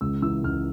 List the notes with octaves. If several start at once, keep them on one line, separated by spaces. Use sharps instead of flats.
C#2 E6
E3 E6
C#2 F6